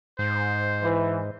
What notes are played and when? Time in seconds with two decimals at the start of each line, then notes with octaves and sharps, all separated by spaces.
0.19 G#2 C5
0.82 E3